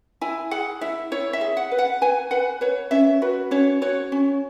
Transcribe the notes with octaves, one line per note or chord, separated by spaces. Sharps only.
E4 G#5
G#4 F#5
E4 E5
E4 C#5
E5
G#4
F#5
B4
F#5
B4 G#5
B4 F#5
B4 C#5
C#4 E5
F#4 B4
C#4 C#5
F#4 C#5
C#4